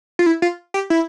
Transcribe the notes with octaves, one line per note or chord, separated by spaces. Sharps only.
F4
E4
F4
G4
E4